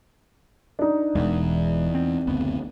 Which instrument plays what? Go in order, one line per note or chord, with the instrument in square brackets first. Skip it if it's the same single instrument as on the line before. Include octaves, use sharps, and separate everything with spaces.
[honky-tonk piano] D4 D#4
[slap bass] E1 G#3 [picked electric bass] E2
[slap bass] C4
[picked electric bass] F#1 D2 B3